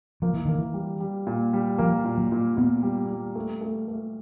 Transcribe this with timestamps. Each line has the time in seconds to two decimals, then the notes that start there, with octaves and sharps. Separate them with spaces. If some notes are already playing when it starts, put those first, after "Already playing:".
0.22 F3 A#3
0.34 E3
0.45 D#3 A#3
0.58 E3
0.74 G3
1.00 G3
1.27 A#2
1.53 G3
1.78 F3 A#3
2.05 A#2
2.18 F#3
2.32 A#2
2.57 A#2 B3
2.83 G3
3.09 G3
3.35 A3
3.61 A3
3.88 A3